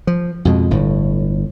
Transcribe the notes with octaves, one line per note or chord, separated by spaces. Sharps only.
F3
F2 B2 G#3
G1 A2